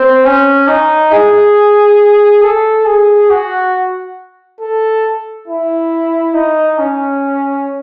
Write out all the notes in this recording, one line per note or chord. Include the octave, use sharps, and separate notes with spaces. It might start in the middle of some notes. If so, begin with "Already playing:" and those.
Already playing: C4
C#4
D#4
G#4
A4
G#4
F#4
A4
E4
D#4
C#4